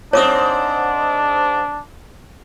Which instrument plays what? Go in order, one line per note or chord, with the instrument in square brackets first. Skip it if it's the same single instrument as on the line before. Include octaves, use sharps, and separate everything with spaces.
[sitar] G#2 C4 [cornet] D4 [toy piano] C#5 D6 D#6